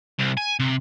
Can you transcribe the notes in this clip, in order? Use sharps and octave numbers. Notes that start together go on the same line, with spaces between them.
C2
G#5
C3